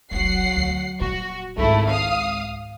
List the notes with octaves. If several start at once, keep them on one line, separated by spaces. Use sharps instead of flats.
F1 C2 F#3 F#5 C7
D2
D#1 A#2 F#4
G#1 C#2 G#3 A3 E4
F5 D#6